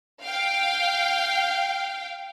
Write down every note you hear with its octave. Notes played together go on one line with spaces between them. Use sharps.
F5 G5